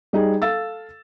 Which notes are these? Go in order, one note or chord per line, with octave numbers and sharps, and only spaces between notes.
G3 D#4 G#4
A4 F5 E6 A6